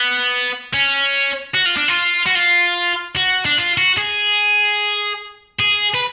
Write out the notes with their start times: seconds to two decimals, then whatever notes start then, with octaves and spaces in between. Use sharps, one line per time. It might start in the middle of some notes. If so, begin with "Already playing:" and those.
Already playing: B3
0.74 C#4
1.55 F#4
1.66 F4
1.77 D4
1.89 F4
2.27 F#4
2.36 F4
3.17 F#4
3.45 D4
3.58 F4
3.78 F#4
3.98 G#4
5.60 G#4
5.95 B4